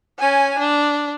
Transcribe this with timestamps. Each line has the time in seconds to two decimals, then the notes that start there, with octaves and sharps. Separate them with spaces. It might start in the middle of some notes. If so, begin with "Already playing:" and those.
0.19 C#4 G#5
0.59 D4